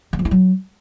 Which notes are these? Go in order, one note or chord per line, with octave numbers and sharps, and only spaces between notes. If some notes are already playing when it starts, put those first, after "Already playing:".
D#3
F3
E4
F#3